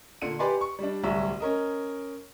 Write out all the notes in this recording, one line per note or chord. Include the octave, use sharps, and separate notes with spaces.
A#2 D3 C#7 D#7
G4 B4 D5 G#5 C6
C#6
G3 D4
D1 C2 F#3 E5
C#4 A#4 D#5